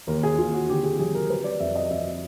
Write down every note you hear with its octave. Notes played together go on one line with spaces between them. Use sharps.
D#2 A#4
G#4
D#2 F4
F#4
D3 G4
G#4
F#3 G#4
A#4
G3 B4
D5
F2 E5
D#5
F2 E5